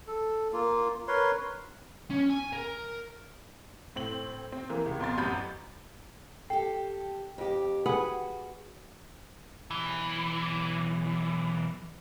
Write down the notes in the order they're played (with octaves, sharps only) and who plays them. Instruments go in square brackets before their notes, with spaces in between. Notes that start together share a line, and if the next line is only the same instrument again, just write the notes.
[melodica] A4
A#3 F4
A#4 B4 C#5 C6
[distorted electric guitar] C#4
G#5
A#4
[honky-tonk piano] A2 C4 F#7
C4
E3 A#3
C#2
B1 F2 B2 C6 A6
A1 F#2 F#4 B5 G6 D#7
[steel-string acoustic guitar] G4 A4 [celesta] G5
[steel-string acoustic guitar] F2 G4
[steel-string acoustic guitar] F#4 [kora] G#4 B4 F#5
[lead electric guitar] B1 E3